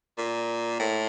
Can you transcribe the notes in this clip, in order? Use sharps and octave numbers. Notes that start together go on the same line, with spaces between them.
A#2
A2